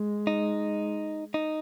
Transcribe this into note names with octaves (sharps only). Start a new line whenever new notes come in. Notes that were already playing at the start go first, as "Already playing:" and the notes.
Already playing: G#3
D#4
D#4